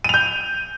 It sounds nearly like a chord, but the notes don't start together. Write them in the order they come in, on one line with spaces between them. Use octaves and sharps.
D#7 F7 G6